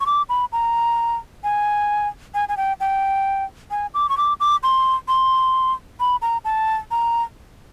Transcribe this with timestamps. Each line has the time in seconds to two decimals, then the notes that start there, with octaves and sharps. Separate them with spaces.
0.01 C#6
0.06 D6
0.29 B5
0.52 A#5
1.44 G#5
2.34 G#5
2.49 G#5
2.57 G5
2.80 G5
3.71 G#5
3.94 D6
4.09 C#6
4.17 D6
4.40 D6
4.63 C6
5.08 C6
6.00 B5
6.22 A#5
6.45 A5
6.91 A#5